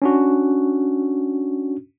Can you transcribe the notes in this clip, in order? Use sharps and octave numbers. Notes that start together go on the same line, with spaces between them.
C#4 D4 F#4